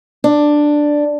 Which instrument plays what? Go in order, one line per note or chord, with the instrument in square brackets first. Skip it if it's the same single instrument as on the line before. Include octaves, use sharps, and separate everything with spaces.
[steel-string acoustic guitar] D4